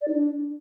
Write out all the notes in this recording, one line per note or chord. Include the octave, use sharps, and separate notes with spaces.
D5
D#4
D4